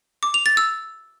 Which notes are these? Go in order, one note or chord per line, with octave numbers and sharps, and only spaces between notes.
D6
F7
A6
E6